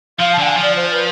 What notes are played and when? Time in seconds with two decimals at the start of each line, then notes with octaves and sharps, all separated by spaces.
0.19 F3 F5
0.33 A5
0.38 D3 F5
0.47 G#5
0.57 F3
0.62 D5
0.76 C5
0.91 B4